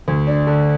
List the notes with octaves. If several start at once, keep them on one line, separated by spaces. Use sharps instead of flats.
D2
D4
D3